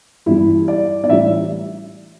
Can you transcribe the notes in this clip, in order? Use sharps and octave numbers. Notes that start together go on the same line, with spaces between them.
G2 E3 G3 E4
D5
D5
A2 E3 G3 E5